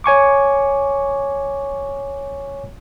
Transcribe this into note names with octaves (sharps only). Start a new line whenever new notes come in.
C#5 G#5 C#6 D6